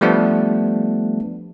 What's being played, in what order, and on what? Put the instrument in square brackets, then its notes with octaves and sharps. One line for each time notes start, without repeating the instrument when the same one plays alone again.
[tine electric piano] F3 G3 A3 B3 D4